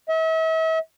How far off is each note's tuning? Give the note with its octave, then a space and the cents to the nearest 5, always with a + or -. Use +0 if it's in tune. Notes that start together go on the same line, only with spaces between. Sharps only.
E5 -40